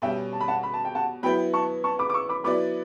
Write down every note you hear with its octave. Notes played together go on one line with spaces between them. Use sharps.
B2 G3 C#4 E5 G5
A5
B5
F#5 A5
B5
A5
G5
F#5 A5
F#3 B3 E4 G5 B5
A5 C#6
A5 C#6
B5 D6
D6
C#6 E6
B5 D6
F#3 B3 E4 B4 D5 B5 D6